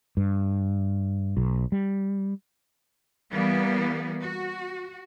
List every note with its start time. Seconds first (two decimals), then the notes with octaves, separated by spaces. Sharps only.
0.17 G2
1.37 B1
1.72 G3
3.31 E3 G3 A#3 B3
4.21 F#4